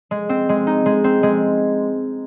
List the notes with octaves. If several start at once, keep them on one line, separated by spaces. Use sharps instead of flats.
G#3
C4
G#3
D#4
G#3
C4
G#3